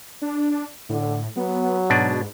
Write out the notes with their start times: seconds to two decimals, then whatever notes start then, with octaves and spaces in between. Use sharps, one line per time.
0.22 D4
0.89 A2 D3
1.37 F#3 B3
1.90 G#2 B2 D4